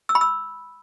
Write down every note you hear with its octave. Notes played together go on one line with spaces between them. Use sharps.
E6
B5
E6